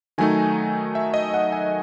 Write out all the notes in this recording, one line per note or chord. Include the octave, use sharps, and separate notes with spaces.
D#3 F#3 A3 D#4 G#5
E5
D#5
F#5
G#5